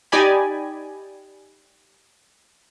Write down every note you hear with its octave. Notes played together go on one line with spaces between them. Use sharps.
D#4 G4 D5 D#5 G#5 B5